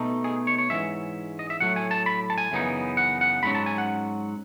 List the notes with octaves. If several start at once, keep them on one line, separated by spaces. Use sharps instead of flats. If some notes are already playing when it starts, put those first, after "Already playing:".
Already playing: B2 A3 D#4
G#4
C#5
C#5
G#2 E3 G#3 C#4 E5
D#5
E5
A2 F#3 A3 F#5
G#5
A5
B5
A5
G#5
F#2 C#3 E3 B3 D#4
F#5
F#5
G#2 F#3 C#4 B5
A5
G#5
F#5